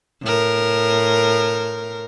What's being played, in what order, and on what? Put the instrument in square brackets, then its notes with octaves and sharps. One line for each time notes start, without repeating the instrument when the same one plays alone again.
[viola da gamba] A2 A#4